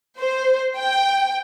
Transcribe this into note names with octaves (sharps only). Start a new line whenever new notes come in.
C5
G5